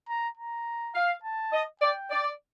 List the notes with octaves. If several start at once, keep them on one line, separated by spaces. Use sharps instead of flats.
A#5
A#5
F5
A5
D#5
D5 G5
D5